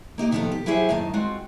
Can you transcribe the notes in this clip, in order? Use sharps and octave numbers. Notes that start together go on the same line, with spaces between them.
A#3 D#4 G4
C3 D#3 F3 B3 G4 A4
G4
F#3 E4 G4 G#4 C5 E5
F#2 A2 D#3 A5
G#3 C4 F4 F#4